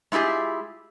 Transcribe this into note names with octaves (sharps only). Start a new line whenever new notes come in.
G#3 E4 F4 G4 G#4